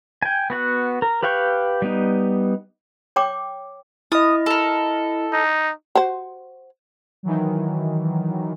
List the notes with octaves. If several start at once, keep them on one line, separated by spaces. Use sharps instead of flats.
G5 G#5
B3 F#4 F#5
A#4
G4 B4 F5 G5 C#6
G3 B3 D#4
C#5 G5 D6
E4 D#5 D#6
A4 A#4
D#4
F#4 C5
D#3 E3 F#3